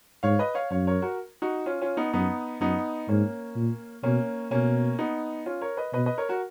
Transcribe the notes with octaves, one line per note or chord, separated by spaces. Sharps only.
G#2 C#5 F5
B4 D#5
C#5 F5
F#2 C#5 F5
A#4 C#5
F#4 A#4
D#4 F#4
C#4 F4
C#4 F4
B3 D#4
F#2 B3 D#4
F#2 B3 D#4
G#2 A#3 C#4
A#2
B2 A#3 C#4
B2 A#3 C#4
B3 D#4
C#4 F4
A#4 C#5
B4 D#5
B2 B4 D#5
B4 D#5
A#4 C#5
F#4 A#4